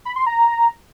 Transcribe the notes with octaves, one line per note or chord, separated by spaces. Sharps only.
B5
C6
A#5